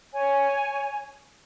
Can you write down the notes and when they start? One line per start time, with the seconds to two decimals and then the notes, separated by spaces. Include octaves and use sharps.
0.13 C#5 G#5